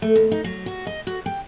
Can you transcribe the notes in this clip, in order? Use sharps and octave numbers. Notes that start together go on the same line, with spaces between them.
A3
D#2
D#4
F#3
F#4
D#5
F#4
G5